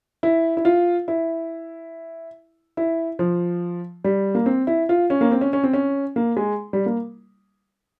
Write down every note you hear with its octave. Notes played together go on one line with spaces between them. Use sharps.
E4
E4
F4
E4
E4
F3
G3
A#3
C4
E4
F4
C#4
A#3
C4
C#4
C#4
C4
C#4
A#3
G#3
G3
A#3